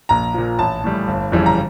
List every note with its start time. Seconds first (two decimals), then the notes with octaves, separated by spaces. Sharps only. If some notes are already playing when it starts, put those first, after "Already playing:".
0.09 A#1 A#5
0.34 A#2 F3
0.58 A1 A5
0.84 A2 G3
1.08 G1
1.32 F2 C#3 E3 G3
1.46 A#5